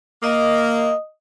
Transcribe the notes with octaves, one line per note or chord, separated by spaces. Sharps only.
A#3 D#5 D#6